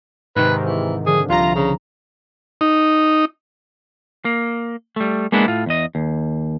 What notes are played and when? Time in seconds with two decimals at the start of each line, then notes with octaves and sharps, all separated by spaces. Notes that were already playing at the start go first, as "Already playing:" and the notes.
0.36 G#2 C3 D#3 B4
0.64 E3
1.06 D3 F3 G#4
1.30 C2 F4 A#5
1.55 C#3
2.61 D#4
4.25 A#3
4.96 G3 A3
5.32 G#3 A#3 B3 D4 E4
5.48 A2 F4
5.66 E2 D#5
5.95 D#2